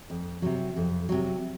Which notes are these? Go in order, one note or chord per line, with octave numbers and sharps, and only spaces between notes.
F2
C3 F#3
F2
C3 F#3